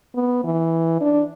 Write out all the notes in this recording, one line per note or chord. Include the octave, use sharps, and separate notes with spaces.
B3
E3
D4